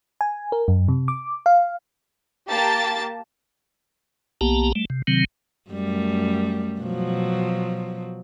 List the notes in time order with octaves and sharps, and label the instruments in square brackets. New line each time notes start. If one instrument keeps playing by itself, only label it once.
[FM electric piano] G#5
A#4
F#2
C3
D6
F5
[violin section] A#3 G4 A5 A6
[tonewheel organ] B1 A#3 B3 G4 A5 A#5
G3 A3
C3
C3 D#3 F#3 C4
[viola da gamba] F#2 G3 A3
B2 F3 F#3